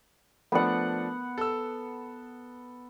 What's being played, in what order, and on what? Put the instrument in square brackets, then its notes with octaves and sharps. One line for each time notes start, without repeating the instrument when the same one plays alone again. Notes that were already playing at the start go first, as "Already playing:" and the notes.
[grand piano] F3 A3 D4 [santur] B3 F#5
[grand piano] A4 E6